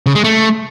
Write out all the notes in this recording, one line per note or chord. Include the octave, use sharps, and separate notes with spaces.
C#3
G#3
A3